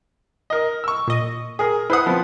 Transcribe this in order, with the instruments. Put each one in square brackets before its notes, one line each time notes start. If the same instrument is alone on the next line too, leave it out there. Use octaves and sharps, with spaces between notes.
[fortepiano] A#4 D#5
C#6 E6
[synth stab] A#2 D#5
[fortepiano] G#4 A#4
[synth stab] E4 C5 F#5 [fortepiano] B4 D#6
[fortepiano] F3 B3 C4